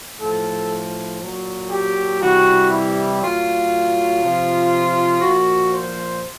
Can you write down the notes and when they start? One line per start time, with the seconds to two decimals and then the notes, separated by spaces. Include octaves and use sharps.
0.20 A2 F3 A4
1.21 A#2 F#3
1.70 G4
2.22 C3 E3 G3 F#4
2.71 E4
3.21 A2 F#3 F4
4.22 C3 F3
5.22 A#2 F3 F#4
5.73 C5